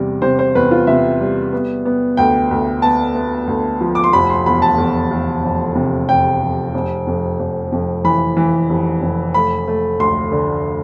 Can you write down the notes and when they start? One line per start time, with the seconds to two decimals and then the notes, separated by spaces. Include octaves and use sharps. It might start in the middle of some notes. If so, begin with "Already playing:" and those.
Already playing: E2 C3 G3
0.22 C3 C5
0.39 C5
0.55 E2 B4
0.71 F4
0.87 C3 E5
1.20 G3
1.53 B3
1.85 B3
2.17 D2 G5
2.51 D2
2.82 B3 A5
3.15 B3
3.47 D2
3.81 F3
3.95 D6
4.04 C6
4.13 F1 B5
4.30 C6
4.46 E2 B5
4.62 A5
4.78 E2
5.11 E2
5.44 F1
5.75 C3
6.08 F1 G5
6.41 F1
6.74 F1
7.07 F2
7.39 F1
7.72 F2
8.04 E3 B5
8.37 E3
8.69 F1
9.02 F1
9.34 A3 B5
9.68 A3
9.99 D2 C6
10.32 D3